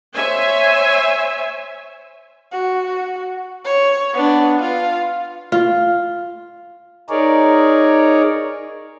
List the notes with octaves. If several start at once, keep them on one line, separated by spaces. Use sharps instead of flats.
C5 C#5 E5 G#5
F#4
C#5
B3 D4
F4
F4
D#4 G#4 A#4 C#5 D5